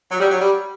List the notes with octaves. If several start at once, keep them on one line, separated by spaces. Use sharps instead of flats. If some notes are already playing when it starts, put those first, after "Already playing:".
F#3
G3
F#3
G3